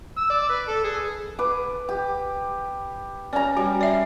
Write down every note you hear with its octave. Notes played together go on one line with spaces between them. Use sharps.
E6
D5
B4
A4
G#4
B4 D6
G4
C#4 D5 A#5
G3 F#4
D5 E5